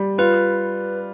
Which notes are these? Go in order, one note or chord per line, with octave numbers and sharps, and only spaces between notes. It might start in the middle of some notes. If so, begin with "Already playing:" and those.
Already playing: G3
F4 B4